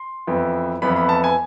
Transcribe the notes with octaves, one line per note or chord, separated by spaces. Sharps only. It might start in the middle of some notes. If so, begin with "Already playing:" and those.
Already playing: C6
F2 E3 B3
F2 E3 B3 B5
B5
A5
G#5